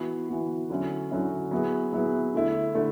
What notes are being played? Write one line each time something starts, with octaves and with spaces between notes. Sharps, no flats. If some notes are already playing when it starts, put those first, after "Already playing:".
Already playing: E3 B3 F#4
E3 B3 F#4
D3 F#3 C#4 E4
D3 F#3 C#4 E4
F#3 B3 E4 G#4
F#3 B3 E4 G#4
D3 A3 E4
D3 A3 E4